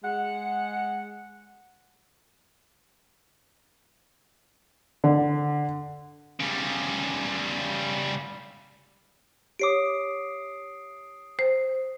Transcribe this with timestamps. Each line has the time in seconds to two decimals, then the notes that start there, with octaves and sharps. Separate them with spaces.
0.04 G#3 F#5
5.04 D3
6.40 C#3 G3
9.59 G4 C#5 D6 D#6 C7 D7
11.39 C5